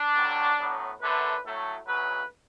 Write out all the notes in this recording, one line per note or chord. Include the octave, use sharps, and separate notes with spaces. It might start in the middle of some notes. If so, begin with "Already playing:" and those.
Already playing: D4
A1 A2 F#3 A3
A2 F#3 B3
F#2 D3 A3 B4
A2 F#3 A3
D2 C#3 F#3 B4